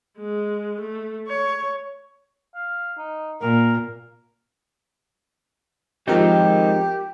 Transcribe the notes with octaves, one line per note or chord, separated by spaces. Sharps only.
G#3
A3
C#5
F5
D#4
A#2 A#4
F3 G#3 C4 D#4 G4 A#4 G5